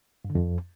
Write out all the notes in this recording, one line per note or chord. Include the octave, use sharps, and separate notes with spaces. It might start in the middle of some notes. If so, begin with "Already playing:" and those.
G2
D3
F2